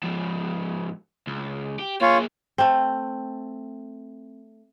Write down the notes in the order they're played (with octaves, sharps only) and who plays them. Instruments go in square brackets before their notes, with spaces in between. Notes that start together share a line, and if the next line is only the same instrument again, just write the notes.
[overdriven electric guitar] G#2 F3
C#2
G4
[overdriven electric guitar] A#3 G#4 [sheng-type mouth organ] F4 C#5
[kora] A3 C4